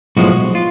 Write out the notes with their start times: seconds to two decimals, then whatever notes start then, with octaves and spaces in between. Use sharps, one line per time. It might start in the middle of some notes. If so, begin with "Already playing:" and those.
0.17 B1 A2 F3 G#3 F#4
0.55 F4